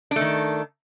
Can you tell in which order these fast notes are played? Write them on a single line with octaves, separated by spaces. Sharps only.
D4 A3 D#3